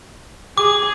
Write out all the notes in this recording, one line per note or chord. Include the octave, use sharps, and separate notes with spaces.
G#4 D6